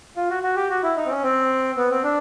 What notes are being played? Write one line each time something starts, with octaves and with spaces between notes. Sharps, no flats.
F4
F#4
F#4
G4
F#4
E4
D#4
C4
C#4
C4
B3
C4
D4